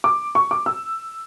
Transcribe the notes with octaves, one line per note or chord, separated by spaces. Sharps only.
D6
C#6
D6
E6